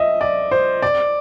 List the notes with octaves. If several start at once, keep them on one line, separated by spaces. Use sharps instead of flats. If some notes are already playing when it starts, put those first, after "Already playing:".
Already playing: D#5 E5
D5
C5
D5